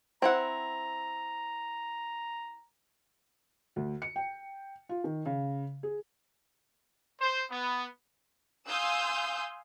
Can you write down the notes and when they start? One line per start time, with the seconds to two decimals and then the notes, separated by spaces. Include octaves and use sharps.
0.22 C4 E4 F#5 A#5
3.76 D2
4.02 C#7
4.16 G5
4.89 F4
5.04 D#3
5.26 C#3
5.83 G#4
7.21 C5
7.51 B3
8.68 F5 G#5 C6 D#6 E6 G6